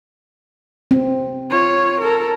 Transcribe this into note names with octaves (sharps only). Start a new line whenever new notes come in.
C4
F4 C#5
A4 A#4